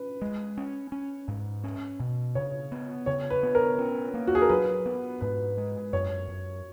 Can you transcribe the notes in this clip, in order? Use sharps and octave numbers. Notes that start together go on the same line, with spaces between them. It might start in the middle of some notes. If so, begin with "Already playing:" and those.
Already playing: C#4 B4
G#3
C#4
C#4
G#2
C#4
B2
C#3 C#5
B3
C#3 C#5
B4
B3
A#4
C#4
A#3
F#4
G#4
A#4
F#3 B4
B3
G#2 B4
G#3
F#2 C#5
F#2